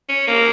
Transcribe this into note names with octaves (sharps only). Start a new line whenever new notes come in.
C#4
A#3